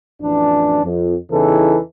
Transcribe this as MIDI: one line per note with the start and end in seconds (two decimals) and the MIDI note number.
0.21 0.81 33
0.21 0.81 41
0.21 0.81 52
0.21 0.81 62
0.84 1.15 41
1.31 1.77 40
1.31 1.77 49
1.31 1.77 52
1.31 1.77 63
1.31 1.77 69